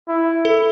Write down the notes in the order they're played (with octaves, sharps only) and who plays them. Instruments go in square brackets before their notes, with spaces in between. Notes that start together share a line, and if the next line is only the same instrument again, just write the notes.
[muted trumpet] E4
[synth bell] A4